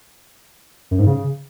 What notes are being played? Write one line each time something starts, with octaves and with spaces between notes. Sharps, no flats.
F#2
G#2
C#3